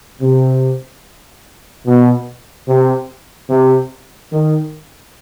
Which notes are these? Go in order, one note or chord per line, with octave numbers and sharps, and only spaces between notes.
C3
B2
C3
C3
D#3